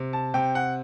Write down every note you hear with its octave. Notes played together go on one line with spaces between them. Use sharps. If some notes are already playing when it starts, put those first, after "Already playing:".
Already playing: C3
A5
C3 G5
F#5